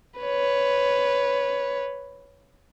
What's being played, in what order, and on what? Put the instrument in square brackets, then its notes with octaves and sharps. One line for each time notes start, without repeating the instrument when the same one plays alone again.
[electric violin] B4 C#5